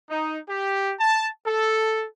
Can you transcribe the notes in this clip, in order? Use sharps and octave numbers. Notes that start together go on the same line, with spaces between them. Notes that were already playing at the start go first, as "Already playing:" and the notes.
D#4
G4
A5
A4